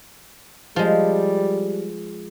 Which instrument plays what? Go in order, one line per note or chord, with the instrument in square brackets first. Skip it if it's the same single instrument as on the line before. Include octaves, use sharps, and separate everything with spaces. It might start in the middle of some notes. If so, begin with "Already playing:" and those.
[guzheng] F3 G#3 [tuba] G3